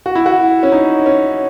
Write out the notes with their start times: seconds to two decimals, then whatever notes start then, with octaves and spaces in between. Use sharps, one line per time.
0.06 F#4
0.15 E4
0.26 F#4
0.63 C#4
0.72 D#4
1.06 C#4